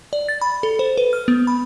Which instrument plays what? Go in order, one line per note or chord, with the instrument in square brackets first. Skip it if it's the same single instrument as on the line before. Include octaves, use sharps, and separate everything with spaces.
[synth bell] D5
A6
B5
A4
C5
B4
F6
B3
B5